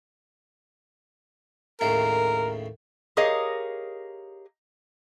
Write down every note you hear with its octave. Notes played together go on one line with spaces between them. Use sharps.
D#2 A2 C#3 A#4
G4 G#4 A#4 C#5 D#5 F5